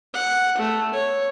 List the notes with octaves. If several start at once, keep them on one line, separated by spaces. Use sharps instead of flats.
F#5
A3
C#5